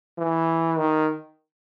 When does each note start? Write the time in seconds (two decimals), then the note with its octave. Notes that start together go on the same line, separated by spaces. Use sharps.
0.18 E3
0.78 D#3